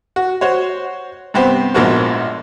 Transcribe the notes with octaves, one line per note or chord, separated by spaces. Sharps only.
F#4
F#4 C5 C#5
G2 C3 B3 G4 C5
A#1 G#2 F3 A#3 B3 F#4